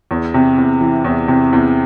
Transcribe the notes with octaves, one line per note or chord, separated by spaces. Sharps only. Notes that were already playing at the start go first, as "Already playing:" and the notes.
E2
C3
E2
E3
E2
C3
E2